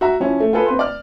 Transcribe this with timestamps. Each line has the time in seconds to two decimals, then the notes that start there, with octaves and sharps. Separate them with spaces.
0.01 F#4 E5 A#5
0.20 F3 C#4 E4
0.40 A3
0.53 F4 G#4 A4 B4
0.66 C4 B4 C6
0.79 D5 F6